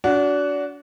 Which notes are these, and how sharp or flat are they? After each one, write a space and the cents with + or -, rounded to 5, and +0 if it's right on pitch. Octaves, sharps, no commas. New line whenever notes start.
D4 -30 F#4 +0